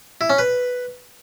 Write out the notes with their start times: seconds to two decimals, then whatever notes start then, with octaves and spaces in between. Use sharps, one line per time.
0.21 E4
0.30 C#4
0.38 B4